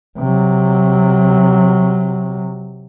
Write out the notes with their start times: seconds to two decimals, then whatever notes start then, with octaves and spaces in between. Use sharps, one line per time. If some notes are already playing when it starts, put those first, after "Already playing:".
0.19 C3 F#3